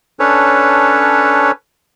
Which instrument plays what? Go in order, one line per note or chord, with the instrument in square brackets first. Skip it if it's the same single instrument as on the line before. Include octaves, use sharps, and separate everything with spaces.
[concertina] C#4 D4 A4 B4 C#5